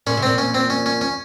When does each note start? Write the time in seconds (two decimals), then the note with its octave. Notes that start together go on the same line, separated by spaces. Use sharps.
0.07 A#2 C#4
0.17 C3
0.23 A#2 C4
0.38 C#4
0.54 C4
0.70 C#4
0.86 C#4
1.01 C#4